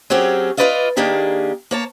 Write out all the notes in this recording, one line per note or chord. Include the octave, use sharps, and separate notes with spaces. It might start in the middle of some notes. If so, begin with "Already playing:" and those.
F#3 C4 C#4 G4 G#4
F4 G4 B4 D5 D#5 F5
D#3 A#3 D4 G4 G#4
A#3 C#5 A5